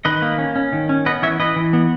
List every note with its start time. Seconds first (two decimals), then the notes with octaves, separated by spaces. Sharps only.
0.05 D#3 B4 D#5
0.22 A#3
0.38 C#4
0.56 C#4
0.73 D#3
0.89 C#4
1.06 B3 B4 D#5
1.22 E3 C#5 E5
1.40 E3 B4 D#5
1.56 E3
1.73 B3